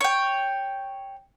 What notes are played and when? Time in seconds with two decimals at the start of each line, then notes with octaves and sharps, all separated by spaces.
0.01 C#5 G5